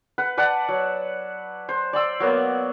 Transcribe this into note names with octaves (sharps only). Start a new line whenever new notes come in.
B4 F#5
B4 D5 F#5 A5
F#3
C5
D5 C6 E6
F#3 A#3 B3